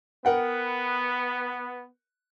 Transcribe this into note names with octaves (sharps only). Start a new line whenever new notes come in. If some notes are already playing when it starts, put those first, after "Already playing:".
B3 A#4 F#5 G5